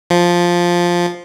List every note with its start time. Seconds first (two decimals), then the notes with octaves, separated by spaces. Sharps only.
0.10 F3